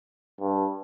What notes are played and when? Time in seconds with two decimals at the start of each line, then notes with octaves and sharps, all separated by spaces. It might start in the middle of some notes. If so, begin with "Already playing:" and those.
0.40 G2